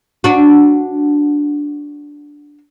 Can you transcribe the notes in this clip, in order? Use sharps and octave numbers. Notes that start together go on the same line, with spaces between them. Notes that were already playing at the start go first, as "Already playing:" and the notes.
D4 F#4